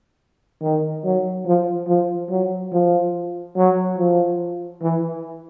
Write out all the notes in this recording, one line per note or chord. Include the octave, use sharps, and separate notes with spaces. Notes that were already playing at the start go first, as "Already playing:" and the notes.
D#3
F#3
F3
F3
F#3
F3
F#3
F3
E3